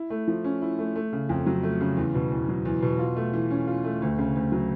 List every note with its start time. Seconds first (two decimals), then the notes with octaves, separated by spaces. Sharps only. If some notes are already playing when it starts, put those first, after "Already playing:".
Already playing: E4
0.10 A3
0.28 F3
0.44 C#4
0.62 E4
0.79 A3
0.96 A3
1.13 C#3
1.29 F2
1.46 F#3
1.63 A3
1.81 C#3
1.97 E2
2.14 B2
2.32 E2
2.49 F#3
2.65 E2
2.82 B2
2.99 F4
3.16 A3
3.33 E3
3.50 C#4
3.67 F4
3.84 A3
4.02 D2
4.18 C#3
4.35 D2
4.52 F#3